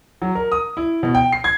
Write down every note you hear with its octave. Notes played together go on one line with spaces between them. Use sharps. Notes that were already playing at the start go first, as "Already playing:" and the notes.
F#3
A#4
D#6
E4
B2
G5
C7
G#6